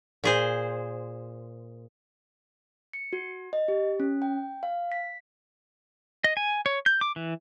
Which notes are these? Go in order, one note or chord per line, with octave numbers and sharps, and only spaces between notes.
A#2 G#4 C5
C#7
F#4
D#5
G4
C#4
G5
F5
B6
D#5
G#5
C#5
G6
D6
E3